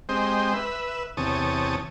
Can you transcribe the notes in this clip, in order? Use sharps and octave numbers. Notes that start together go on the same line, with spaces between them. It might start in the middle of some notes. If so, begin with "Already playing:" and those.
G#3 C4 G4 C5 D#5
B4 E5
E2 C3 C#5 A5 D#6